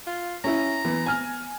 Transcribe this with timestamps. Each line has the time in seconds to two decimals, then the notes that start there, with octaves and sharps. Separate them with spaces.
0.07 F4
0.44 C#4 E4 A#5
0.85 E3 B3
1.06 G#5 F6